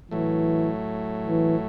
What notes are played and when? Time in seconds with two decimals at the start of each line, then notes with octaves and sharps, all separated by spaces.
0.11 A2 E3 F#3 A3
1.26 E3